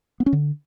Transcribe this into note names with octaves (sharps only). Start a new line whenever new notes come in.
B3
C#4
D3